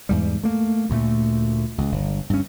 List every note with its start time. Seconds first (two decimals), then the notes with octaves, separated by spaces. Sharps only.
0.09 E2 G#2 G3
0.43 A3 A#3
0.90 D2 A#2 A3
1.78 C#2
1.92 G1
2.30 G2 C#4